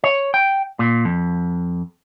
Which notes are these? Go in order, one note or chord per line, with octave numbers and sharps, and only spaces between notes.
C#5
G5
A#2
F2